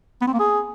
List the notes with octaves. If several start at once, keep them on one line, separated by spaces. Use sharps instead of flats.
B3
C4
A#3
G#4